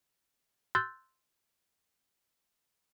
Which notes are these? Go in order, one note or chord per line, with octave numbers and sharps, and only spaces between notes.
C6 E6 F#6 G6 A6